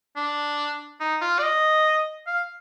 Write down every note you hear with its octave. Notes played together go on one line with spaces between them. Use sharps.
D4
D#4
F4
D5
D#5
F5